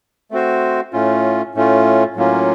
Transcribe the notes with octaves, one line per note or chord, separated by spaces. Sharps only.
A3 C4 F#4 C5
A2 A3 C#4 F4
A2 A3 C#4 F4
A2 F#3 A#3 C#4 F4